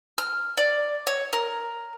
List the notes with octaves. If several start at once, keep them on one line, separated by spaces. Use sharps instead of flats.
F6
D5
C#5
A#4